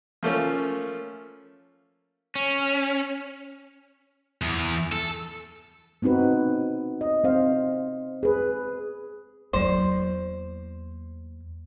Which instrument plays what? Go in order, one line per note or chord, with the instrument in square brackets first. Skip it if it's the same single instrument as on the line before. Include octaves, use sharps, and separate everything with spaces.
[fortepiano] F3 A3 A#3 C#4
[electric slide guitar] C#4
[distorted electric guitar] E2
A4
[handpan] B3 C4 D#4 F#4 B4
D#5
C4 C5 F5
G#4 B4
[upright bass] E2 A#3 [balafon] F#3 D5 [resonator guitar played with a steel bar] C5